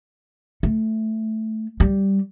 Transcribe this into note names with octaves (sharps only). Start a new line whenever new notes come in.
A3
G3